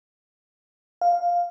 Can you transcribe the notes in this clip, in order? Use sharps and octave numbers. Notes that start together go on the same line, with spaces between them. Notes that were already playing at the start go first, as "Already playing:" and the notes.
F5